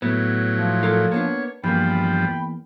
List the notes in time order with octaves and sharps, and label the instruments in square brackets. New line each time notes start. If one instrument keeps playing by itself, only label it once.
[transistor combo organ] A2 F#3 [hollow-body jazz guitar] B3
[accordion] F3
[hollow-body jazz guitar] F4 A4 A#4
[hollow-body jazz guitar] A#3 B3 D4 [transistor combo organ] C#5
[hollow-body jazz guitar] E2 A#3 [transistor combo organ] G2 F3 [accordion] G5 B5